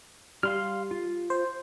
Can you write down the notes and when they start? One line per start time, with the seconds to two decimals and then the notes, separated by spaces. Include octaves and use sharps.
0.43 G3 F5 C6 F6
0.91 F4
1.30 C5